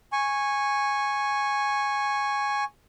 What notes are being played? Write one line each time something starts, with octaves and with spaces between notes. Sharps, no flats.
G#5 C#6